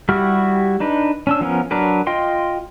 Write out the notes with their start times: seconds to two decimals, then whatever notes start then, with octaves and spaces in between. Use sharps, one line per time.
0.09 G3 E4 F#4 G4 F6
0.80 D4 D#4 B4
1.27 C#4 D4 E6
1.41 F3 B3 C#4 A#4
1.71 F#3 D4 A#4 B4
2.07 F4 D#5 G5 C6